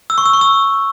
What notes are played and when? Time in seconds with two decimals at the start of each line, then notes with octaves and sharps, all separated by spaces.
0.10 E6
0.18 C#6
0.26 E6
0.33 C#6
0.41 E6